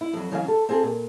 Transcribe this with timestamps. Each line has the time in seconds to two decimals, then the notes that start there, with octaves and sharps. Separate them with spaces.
0.01 E4
0.13 F2 F#3
0.32 C#3 E3 F#3 C#4 C#5 F5
0.48 A4
0.69 C4 F4 G#4 A4
0.83 A#2